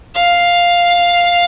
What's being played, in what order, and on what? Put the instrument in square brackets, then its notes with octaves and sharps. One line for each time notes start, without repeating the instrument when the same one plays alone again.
[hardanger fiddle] F5